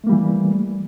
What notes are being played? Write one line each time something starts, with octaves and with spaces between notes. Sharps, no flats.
E3 G3 A3 A#3